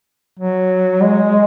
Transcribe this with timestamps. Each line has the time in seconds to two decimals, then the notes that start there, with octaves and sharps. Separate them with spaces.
0.39 F#3
1.02 G#3